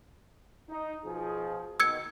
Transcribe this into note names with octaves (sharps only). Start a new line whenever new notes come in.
D#4
B2 F3 G#4
B2 D#3 E6 G#6 C#7